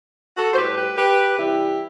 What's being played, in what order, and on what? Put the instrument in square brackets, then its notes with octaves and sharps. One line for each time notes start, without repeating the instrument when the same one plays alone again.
[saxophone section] F#4 A4
C5
A2 G3 G4 B4
G4 B4
G4 B4
C3 E3 G3 E4 G4